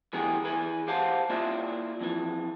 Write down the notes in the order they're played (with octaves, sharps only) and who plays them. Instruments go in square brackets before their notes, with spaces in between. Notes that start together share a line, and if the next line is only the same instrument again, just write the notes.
[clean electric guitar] D3 E3 B3 G4 G#4
E3 G#4 B4
G4 C5 F5 F#5 A5
A#3 E4 F4 D5 E5
F2 E3